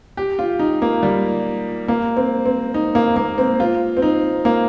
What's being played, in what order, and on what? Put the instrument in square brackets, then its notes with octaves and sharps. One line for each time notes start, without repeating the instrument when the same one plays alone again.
[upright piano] G4
F4
D#4
A#3
G3
A#3
C4
C4
D#4
A#3
A#3
C4
F4
C4
D#4
A#3